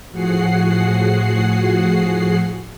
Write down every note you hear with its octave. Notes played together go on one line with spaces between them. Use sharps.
A2 F3 F#4 G#4 F#5 C7